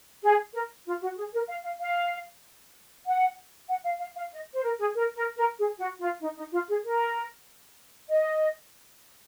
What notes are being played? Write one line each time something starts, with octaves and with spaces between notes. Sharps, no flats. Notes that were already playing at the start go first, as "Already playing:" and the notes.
G#4
A#4
F4
F#4
G#4
A#4
F5
F5
F5
F#5
F#5
F5
F5
F5
D#5
C5
A#4
G#4
A#4
A#4
A#4
G#4
F#4
F4
D#4
D#4
F4
G#4
A#4
D#5